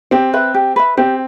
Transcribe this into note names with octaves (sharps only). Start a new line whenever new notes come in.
C4 G4
B4 E5
G4
B4 E5
C4 G4